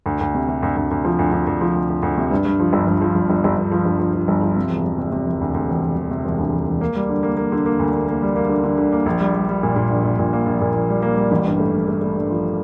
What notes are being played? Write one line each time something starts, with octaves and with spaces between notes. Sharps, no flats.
D2
D2
C3
C3
D2
D2
D2
F3
D2
D2
D2
F3
D2
D2
D2
C3
G2
G2
F3
G1
G1
F3
G1
G1
G1
G1
F3
G1
F3
F3
G1
F3
C3
E1
E1
C3
C3
E1
D2
D2
E1
E1
E1
C3
E1
D2
E1
E1
A#3
G3
D3
A#3
A#3
D3
A#3
D2
A#3
A#3
G3
A#3
D3
D3
D3
A#3
A#1
G3
G3
G3
A#2
A#2
A#1
A#1
A#2
A#3
A#1
A#2
A#1
G3
A#3
G3
A1
G2
A3
A1
A3
A3
G2
F3